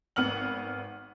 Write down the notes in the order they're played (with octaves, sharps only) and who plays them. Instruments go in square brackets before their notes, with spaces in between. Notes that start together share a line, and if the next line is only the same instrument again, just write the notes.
[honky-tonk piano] G#1 B3 F#5 F6 F#7